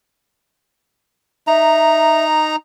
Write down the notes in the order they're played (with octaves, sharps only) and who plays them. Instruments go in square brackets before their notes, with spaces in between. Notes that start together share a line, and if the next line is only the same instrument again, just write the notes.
[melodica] D#4 A#5 [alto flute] E5